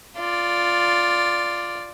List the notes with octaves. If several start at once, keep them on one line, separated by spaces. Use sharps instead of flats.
F4 D5